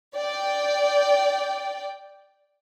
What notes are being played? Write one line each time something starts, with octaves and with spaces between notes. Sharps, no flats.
D5 G5